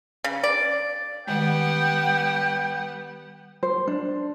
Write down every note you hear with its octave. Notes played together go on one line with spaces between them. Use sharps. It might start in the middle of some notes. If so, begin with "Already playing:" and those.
C#3
D5
D#3 G3 G#3 B3 F#5 G5
C5
D4